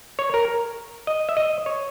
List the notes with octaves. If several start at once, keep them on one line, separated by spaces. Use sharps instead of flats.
C#5
A#4
D#5
E5
D#5
C#5